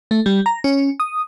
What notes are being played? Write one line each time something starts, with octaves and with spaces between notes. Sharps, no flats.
A3
G3
A#5
C#4
D#6